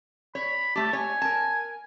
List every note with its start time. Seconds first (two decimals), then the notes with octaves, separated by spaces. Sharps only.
0.35 C#5 B5
0.76 A3 G4 A5
0.93 C#5 G#5
1.22 A#4 A5